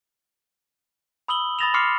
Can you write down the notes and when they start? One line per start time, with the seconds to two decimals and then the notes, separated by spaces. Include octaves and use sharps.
1.28 B5 D#6 E6 F#7 G7
1.59 B5 D#6 A6 A#6 E7 F7
1.74 B5 C6 D6 F6 C7 C#7